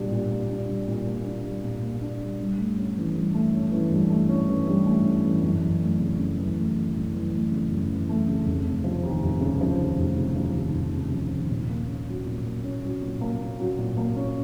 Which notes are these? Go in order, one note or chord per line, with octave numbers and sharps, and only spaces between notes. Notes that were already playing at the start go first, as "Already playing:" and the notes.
Already playing: A#2 G3 A#3 D4
A#2
A#3
D4
G3
A#2
A#3
D4
G3
A#2
A#3
D4
G3
G2
A3
C#4
E3
G2
A3
C#4
E3
G2
A3
C#4
E3
G2
A3
C#4
E3
F#2
E3
A3
C#3
F#2
E3
A3
C#3
F#2
E3
A3
C#3
F#2
E3
A3
C#3
F1
C#3
F3
D#2
F1
C#3
F3
D#2
F1
C#3
F3
D#2
F1
C#3
F3
D#2
A#2
A#3
C#4
F#3
A#2
A#3
C#4
F#3
A#2
A#3
C#4
F#3
A#2
A#3
C#4